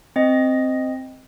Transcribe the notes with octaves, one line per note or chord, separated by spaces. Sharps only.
C4 D#5